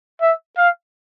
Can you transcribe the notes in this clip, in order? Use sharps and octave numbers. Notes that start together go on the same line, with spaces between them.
E5
F5